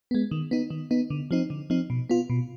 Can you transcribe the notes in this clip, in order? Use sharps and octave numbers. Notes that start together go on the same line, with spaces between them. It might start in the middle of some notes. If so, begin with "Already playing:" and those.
G#3 B3
D#3
B3 D#4
D#3
B3 D#4
D3
F3 C4 D#4
D3
F3 C4 D#4
B2
B3 F4
B2